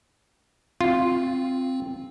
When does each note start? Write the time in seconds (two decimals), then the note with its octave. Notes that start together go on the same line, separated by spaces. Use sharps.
0.81 C4 F4